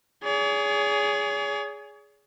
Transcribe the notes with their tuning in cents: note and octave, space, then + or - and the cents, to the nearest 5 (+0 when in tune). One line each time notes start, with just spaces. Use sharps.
G#4 +0 C#5 +45